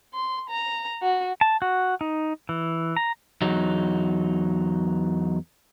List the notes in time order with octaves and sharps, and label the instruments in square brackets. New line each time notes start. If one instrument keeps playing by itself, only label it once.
[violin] C6
A#5
F#4
[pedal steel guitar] A5
F#4
D#4
E3
A#5
[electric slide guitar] E2 F#3 D#4